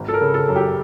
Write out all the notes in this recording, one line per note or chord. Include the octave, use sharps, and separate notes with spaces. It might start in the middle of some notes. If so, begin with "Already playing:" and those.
Already playing: G#1
A4
A#4
C#3
A4
F#2
G4